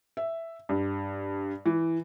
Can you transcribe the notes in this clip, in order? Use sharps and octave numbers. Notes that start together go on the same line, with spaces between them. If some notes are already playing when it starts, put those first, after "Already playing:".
E5
G2
E3